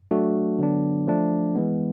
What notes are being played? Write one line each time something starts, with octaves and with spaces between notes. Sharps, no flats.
F#3 A3 D4 F#4
D3 F#3 B3 D4
F3 A3 D4
E3 G#3 B3